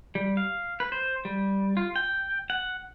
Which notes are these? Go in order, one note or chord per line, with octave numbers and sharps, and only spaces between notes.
G3
F5
B4
C5
G3
F4
G5
F#5